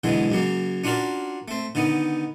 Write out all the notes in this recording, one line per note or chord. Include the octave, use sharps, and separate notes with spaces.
B2 D3 E3 F#3 G#3
F#2 C#3 F#3 A#3
C#4 D4 F4 F#4 A#4 D5
A3 C4
D3 D#3 B3 D#4